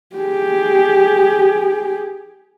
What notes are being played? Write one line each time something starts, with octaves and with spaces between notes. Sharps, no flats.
G4 G#4